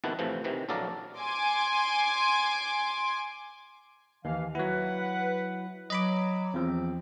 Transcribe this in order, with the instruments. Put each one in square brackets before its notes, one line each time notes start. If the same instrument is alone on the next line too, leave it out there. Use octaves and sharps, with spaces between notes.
[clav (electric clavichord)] F2 B2 D#3 E4 F#5 A5
A2 C3 E3 F3
C3 D#3 E3
A#1 F#3 A4 D5 F5 A#5
[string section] G#5 C6 D6
[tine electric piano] D#2 [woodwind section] E3 F5
[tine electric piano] F#3 E4 [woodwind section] B4 F#5
[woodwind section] F#3 [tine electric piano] D#5 B5 D6
[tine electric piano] E2 F3 [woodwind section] C4